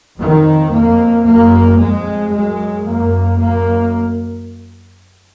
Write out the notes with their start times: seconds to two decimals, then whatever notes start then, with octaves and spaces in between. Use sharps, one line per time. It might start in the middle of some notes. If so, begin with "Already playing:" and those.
0.18 F2 D#3
0.72 F2 A#3
1.26 F#2 A#3
1.79 F2 G#3
2.33 F#2 G#3
2.86 F#2 A#3
3.40 F#2 A#3